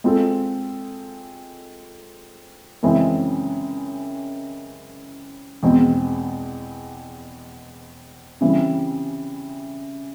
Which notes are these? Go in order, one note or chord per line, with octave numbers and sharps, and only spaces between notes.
G#3 C4 F4 A4
F#2 C#3 E3 G#3 C4
E2 B2 G#3 C4
C#3 E3 G3 C4